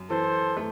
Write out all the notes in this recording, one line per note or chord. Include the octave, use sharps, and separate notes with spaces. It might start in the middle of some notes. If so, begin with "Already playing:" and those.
Already playing: F#2
E3 A4 C5
A3